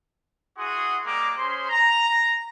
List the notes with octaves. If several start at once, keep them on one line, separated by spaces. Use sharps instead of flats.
E4 F#4 G#4 F#5 C6 D#6
G3 G#3 A#3 A#5 D6
C#4 G#4 C5 C6
A#5